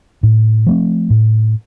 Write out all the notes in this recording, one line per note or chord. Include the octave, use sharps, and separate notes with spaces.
A2
F3 A3 C4
A2